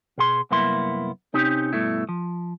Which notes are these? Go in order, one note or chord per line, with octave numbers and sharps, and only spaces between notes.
B2 G#4 C6
C2 F#2 A#3 B3 E4 C6
C3 C4 C#4 D#4 G4
G2 B2 A3 E4
F3